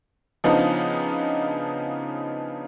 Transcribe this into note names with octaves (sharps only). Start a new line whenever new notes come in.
C#3 F3 B3 D4 D#4